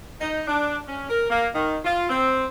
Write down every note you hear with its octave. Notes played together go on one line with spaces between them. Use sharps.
D#4
D4
C#4
A#4
A#3
D#3
F4
C4